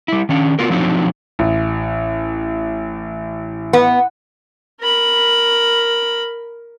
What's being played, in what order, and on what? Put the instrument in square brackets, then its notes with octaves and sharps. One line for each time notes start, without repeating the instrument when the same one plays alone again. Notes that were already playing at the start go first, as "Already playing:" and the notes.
[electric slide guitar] G3 E4
D#3 C#4 D4
B3 F4 F#4 A#4
F3 F#3 C4 D4 D#4
[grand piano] A1
[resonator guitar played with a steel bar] B3
[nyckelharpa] A#4 B5